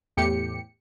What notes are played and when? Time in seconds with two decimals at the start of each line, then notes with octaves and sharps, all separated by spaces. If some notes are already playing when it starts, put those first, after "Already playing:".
0.17 E2 A2 G4 C#7